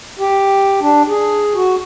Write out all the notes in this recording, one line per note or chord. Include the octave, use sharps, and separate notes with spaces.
G4
D4
G#4
F#4